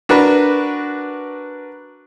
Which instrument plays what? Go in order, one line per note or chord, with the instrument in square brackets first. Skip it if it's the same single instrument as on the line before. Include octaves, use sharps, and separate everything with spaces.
[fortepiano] D4 F#4 A#4 B4